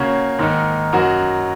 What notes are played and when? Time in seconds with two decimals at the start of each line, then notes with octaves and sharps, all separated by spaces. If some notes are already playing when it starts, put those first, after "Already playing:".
Already playing: C#3 A#3 F#4 C#5
0.39 G#2 D#3 A#3 D#4
0.93 F#2 F#3 D#4 F#4 A#4